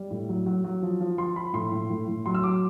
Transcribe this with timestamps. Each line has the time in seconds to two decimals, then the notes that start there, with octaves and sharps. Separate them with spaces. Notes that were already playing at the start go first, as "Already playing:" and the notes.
Already playing: G3
0.11 A2
0.29 F#3
0.46 F#3
0.64 F#3
0.82 F3
1.00 F3
1.18 F3 C6
1.36 F3 B5
1.53 A2 C6
1.72 A2
1.90 A2
2.08 A2
2.26 F#3 C6
2.35 E6
2.43 F#3 D6